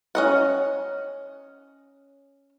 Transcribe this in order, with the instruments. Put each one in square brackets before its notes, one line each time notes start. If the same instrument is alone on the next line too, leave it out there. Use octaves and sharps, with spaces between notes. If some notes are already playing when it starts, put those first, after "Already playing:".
[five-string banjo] C#4 D#5 F#5